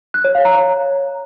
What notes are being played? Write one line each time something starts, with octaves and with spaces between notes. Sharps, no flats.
F#6
C#5
F5
A#5
C#5